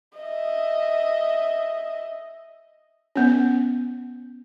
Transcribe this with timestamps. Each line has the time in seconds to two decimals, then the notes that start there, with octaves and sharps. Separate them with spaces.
0.18 D#5 E5
3.16 B3 C#4